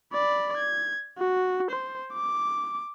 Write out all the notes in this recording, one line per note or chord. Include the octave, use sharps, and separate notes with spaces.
D5 B5
G#6
F#4
C5
D6